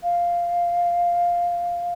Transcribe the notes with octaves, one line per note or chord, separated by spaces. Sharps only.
F5